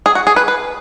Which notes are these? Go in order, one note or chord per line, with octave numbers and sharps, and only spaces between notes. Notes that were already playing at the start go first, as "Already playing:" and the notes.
G#4
F#4
G#4
B4
B4